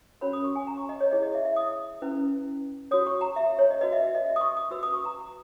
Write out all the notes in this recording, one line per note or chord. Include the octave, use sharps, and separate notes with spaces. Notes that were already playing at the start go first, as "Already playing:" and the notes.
C#4 F#4 A#4 C#5 B5
D#6
C#6
G#5
A#5
C#6
D#5
C#5
E4 G#4 C#5 D#5
D#5
E5
E5
D#6
C#4 E4 B4
F#4 C#5 D#6
C#6
A#5
E5
C#5
D#5
F#4 B4 D#5
E5
E5
D#5
E5
D#6
C#6
D#6
F#4 B4 E6
D#6
C#6
A#5